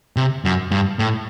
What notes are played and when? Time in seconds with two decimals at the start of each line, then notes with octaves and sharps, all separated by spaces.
0.17 C3
0.45 F#2
0.71 G2
0.99 A2